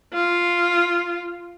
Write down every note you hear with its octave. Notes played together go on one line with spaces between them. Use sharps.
F4